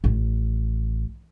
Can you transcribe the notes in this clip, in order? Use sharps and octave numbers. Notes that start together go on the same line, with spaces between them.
A1